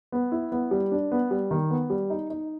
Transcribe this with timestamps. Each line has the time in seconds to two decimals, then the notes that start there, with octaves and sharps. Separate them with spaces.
0.12 B3
0.32 E4
0.52 B3
0.71 G3
0.92 D4
1.12 B3
1.31 G3
1.51 D#3
1.71 B3
1.90 G3
2.10 D#4
2.30 D#4